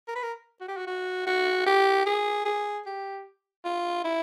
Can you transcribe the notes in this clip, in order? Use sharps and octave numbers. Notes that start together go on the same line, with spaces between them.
A#4
B4
A#4
F#4
G4
F#4
F#4
F#4
G4
G#4
G#4
G4
F4
E4